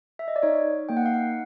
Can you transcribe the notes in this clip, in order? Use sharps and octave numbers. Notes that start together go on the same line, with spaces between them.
E5
D#5
D5
D#4 C#5
A#3 G5
F#5
F5
F#5